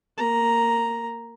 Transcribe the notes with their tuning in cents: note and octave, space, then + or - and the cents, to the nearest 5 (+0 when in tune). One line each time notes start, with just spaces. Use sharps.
A#3 -15 A#5 +0